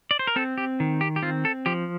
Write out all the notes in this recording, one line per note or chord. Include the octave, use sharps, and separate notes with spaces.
D5
C5
A#4
C4 A4
G4
D#3
G4
G4
C4 F4
A4
F3 G4